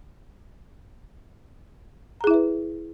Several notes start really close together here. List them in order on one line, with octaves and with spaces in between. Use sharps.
A#5 G#4 E4 E5 B4